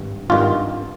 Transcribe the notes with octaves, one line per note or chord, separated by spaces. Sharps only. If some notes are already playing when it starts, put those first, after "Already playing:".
Already playing: G#1 G2
G#1 G2 D#3 F4